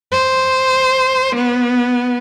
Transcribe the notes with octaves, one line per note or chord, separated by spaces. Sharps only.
C5
B3